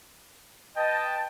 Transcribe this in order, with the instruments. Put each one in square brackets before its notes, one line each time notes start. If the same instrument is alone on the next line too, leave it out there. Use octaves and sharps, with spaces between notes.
[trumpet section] B4 G5 A5 [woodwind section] D#5